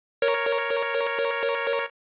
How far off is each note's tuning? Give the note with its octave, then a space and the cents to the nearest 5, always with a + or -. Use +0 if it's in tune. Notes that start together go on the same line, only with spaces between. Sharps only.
A#4 +0 C#5 +0